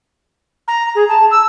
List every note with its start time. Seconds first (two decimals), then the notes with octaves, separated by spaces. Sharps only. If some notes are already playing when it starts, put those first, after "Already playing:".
0.67 A#5
0.95 G#4
1.08 A5
1.30 E6